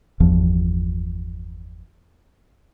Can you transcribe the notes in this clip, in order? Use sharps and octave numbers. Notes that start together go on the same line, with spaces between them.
G1 E2 F3